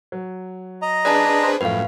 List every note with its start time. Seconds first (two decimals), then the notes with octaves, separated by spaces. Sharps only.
0.12 F#3
0.82 D#5 A#5
1.05 D4 G#4 B4 D5 A5
1.44 C5
1.61 F#2 A2 F3 A3 B4 F5